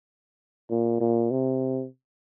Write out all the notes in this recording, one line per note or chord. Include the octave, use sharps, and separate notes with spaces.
A#2
A#2
C3